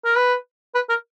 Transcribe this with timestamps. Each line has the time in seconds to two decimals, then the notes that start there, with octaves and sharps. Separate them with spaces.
0.05 A#4
0.16 B4
0.75 B4
0.89 A#4